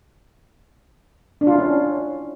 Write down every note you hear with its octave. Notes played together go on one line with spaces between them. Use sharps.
D4
F4
E4
C#4